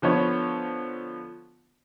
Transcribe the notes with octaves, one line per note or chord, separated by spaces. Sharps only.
D3 F3 B3 C#5